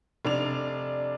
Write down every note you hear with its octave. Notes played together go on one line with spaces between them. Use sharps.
F1 D4 D5 F7